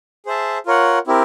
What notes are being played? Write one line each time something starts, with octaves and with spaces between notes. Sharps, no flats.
G#4 C5 E5 A5
F4 A#4 C#5 F#5
C4 E4 G4 A#4